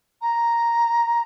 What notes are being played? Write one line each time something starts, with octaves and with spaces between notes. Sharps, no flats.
A#5